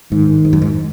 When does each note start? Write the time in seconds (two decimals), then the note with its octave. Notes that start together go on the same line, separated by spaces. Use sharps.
0.12 G#2 D#3
0.45 G#2
0.53 F#2
0.62 G#2